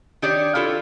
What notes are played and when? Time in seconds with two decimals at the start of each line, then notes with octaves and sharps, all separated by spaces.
0.22 D#3 D4 G4 C#5 D5
0.55 E4 F4 A4 C#5